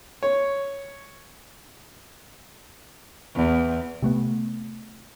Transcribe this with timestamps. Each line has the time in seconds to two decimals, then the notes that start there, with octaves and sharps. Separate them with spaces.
0.23 C#5
3.36 E2
4.02 C3 A3 B3